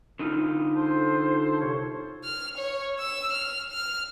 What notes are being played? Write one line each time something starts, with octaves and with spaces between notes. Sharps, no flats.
D3 D#4 F4
A4 C5
C2 C3 C#5
F6
C#5
E6
F6
F6